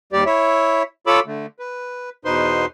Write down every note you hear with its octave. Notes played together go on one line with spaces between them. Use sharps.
D#2 G3 G4 D5
E4 C#5 E5
F4 A4 C#5 B5 D6 E6
D3 A3
B4
E2 B2 D#4 B4 C5 C6